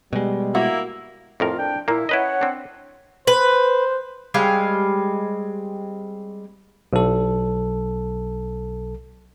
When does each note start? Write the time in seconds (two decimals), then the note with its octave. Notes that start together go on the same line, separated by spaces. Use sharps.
0.13 B2 G3 G#3
0.55 A#3 E4 F#4
1.40 F2 A2 F4 A#4
1.58 D4 G5
1.88 A#2 A#3 E4
2.09 C#4 E4 B4 C#5 D#5 F#5
2.41 C4 D4
3.27 B4 C5
4.34 G3 G#3 C4 F5
6.93 B1 A4